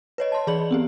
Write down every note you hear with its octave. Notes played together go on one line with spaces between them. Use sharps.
B4 C#5 D#5
A5 C6
E3 G#4 D5 B5 F#7
B3 C4 G4